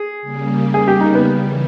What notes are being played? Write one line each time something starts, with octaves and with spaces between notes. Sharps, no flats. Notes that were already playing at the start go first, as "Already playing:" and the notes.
Already playing: G#4
C#3 G3 A#3
G#4
G4
D#4
B3
C#3 E3 G3